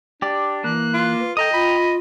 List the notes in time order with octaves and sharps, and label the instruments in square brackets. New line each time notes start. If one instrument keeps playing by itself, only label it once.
[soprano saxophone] D4 [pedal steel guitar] G4 D5
[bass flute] E3 [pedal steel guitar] A#3 [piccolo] F#6
[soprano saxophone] F4
[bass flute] B4
[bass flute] A4 [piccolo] D#5 [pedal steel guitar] G5 A#5 D#6
[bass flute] F4 [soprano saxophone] B5